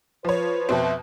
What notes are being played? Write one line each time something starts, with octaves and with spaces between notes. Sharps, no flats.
F3 F4 B4 C#5
F2 B2 C4 E5